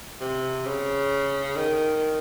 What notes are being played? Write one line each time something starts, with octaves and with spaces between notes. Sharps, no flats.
C3
C#3
D#3